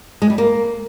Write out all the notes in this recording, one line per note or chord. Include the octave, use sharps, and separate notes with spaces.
G#3
G3
A#3